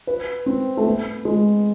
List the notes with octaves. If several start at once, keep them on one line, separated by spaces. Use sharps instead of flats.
B4
C4
A3
B3
G#3